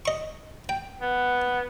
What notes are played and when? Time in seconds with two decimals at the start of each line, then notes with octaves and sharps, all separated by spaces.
0.06 D#5 C#6
0.69 G5
1.01 B3